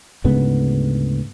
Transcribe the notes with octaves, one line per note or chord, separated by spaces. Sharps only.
D2 G#2 C#3 B3